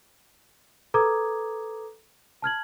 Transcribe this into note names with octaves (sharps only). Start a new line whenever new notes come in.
A4 B4 A#5 D6 D#6 G#6
A5 F6 G#6 F#7